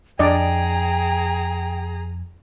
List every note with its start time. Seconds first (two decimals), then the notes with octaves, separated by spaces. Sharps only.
0.19 F2 D4 G#4 D5 D#5 G5 A#5